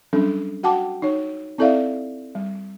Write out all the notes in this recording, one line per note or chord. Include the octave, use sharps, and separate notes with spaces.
F#3 G3 C#4 D4 A4
F#4 F#5 G5 A5 D6
D#4 C#5
C4 E4 A4 D5 E5 F5
G3